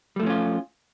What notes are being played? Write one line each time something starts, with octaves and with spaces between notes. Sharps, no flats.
F3 G3 A3 C#4 F4